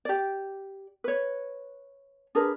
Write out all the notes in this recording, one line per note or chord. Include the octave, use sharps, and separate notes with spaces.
G4 D5
B4 C#5
D4 G#4 A#4 B4